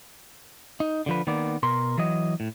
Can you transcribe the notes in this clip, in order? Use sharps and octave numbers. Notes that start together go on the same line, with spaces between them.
D#4
D3 F3 B4
D#3 A#3 B3 D5
B2 A#4 C6
E3 F#3 D#5
A2